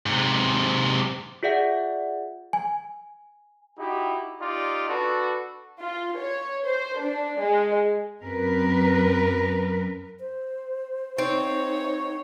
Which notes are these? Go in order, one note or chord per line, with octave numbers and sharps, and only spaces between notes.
G#2 C3
F4 G#4 D5 E5 F#5
G#5
D#4 E4 F#4 G4
D#4 F4 G4 D5
D4 F#4 A4 B4
F4
C#5
C5
D4
G#3
F#2 C4 A#4 B4
C5
C4 D#4 C#5